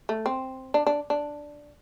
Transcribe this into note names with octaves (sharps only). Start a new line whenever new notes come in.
A3
C4
D4
D4
D4